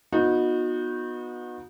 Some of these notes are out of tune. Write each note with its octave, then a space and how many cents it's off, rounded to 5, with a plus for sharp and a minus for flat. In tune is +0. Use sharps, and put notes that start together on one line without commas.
B3 -10 D#4 +0 F#4 -35